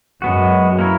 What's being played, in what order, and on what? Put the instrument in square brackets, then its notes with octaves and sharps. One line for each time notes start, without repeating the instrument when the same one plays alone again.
[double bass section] F#2 [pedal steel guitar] G#3 B3 F#4
[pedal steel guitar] A#3 E4 A#4 C#5